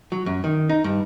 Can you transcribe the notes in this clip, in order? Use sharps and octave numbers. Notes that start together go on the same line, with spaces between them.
F#3
F#2
D#3
D#4
G2